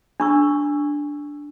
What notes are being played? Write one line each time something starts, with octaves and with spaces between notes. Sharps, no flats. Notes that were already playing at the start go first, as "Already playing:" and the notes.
D4 C#6 E6